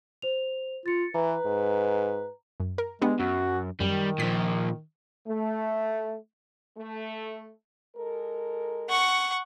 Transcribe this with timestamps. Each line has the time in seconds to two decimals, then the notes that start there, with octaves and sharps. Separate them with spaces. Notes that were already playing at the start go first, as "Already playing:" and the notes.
0.22 C5 F7
0.86 F4 A6 C#7
1.14 E3 B4 A#5
1.46 G#2
2.60 F#2
2.78 A#4
3.02 G#3 B3 D4 G4
3.20 F#2 F#4
3.81 F#2 D#3 G3
4.20 A#2 F3 B6
5.27 A3
6.78 A3
7.96 G#3 A4 A#4
8.89 F#5 C#6